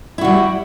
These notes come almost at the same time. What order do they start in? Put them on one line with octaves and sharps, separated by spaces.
E4 F#4 G3